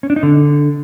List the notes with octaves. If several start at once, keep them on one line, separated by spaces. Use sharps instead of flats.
C#4
D4
D#4
D3